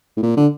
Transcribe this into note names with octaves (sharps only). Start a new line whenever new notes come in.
A2
A#2
D3